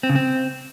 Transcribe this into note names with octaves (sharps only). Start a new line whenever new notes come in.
C4
C#3
C4